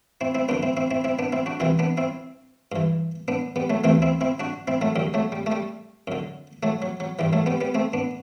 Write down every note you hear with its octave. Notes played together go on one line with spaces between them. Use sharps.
C4 E4
C4 E4
F#2 D3 B3 D4
C4 E4
C4 E4
C4 E4
C4 E4
B3 D4
C4 E4
D4 F#4
C2 C3 E3 C4 E4
B3 D4
C4 E4
G2 E3
B3 D4
G3 B3
F#3 A3
D2 C3 E3 A3 C4
C4 E4
C4 E4
D4 F#4
C4 E4
F#3 A3
F#2 D3 G3
F#3 A3
G3
A3
G3
F#2 D3
F#3 A3
F#3
F#3
G2 E3 G3
F#3 A3
G3 B3
G3 B3
A3 C4
B3 D4